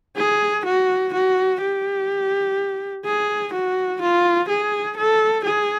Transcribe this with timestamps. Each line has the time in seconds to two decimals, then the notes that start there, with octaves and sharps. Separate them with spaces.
0.17 G#4
0.65 F#4
1.13 F#4
1.62 G4
3.05 G#4
3.53 F#4
4.01 F4
4.49 G#4
4.97 A4
5.44 G#4